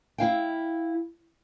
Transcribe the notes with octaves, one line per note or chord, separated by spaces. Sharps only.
E4 F5 G5